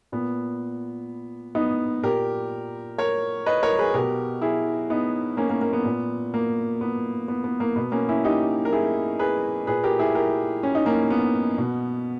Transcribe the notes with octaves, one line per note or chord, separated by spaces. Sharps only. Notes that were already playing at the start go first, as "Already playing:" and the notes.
A#2 B3
B3 D#4
A#2 G4 A#4
A#4 C#5
B4 D#5
A#4 C#5
G#4 B4
B2 G4 A#4
E4 G#4
B3 D#4
A#3 C#4
A#3
A#3
B3
A#2
A#3
B3
B3
B3
A#3
B2 B3
A#3 C#4
C#4 E4
D#4 G4
A#4
E4 G#4
G#4 B4
A#2 G#4 B4
G4 A#4
E4 G#4
G4 A#4
C#4
D#4
A#3 C#4
B3
B2